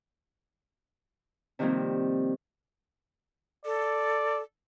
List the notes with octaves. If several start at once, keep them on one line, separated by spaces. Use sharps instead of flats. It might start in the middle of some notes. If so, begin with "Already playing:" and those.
C3 D#3 F3 G3 A#3 C4
A4 D5